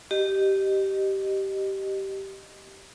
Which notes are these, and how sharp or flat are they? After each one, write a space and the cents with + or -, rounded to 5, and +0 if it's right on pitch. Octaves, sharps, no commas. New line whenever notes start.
G4 -15 D#5 -20